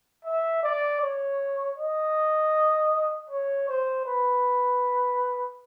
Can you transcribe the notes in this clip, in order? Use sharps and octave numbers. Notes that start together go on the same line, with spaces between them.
E5
D5
C#5
D#5
C#5
C5
B4